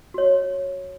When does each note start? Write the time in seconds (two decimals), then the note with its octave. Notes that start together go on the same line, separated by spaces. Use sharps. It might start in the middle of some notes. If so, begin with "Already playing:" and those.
0.14 F#4 C#5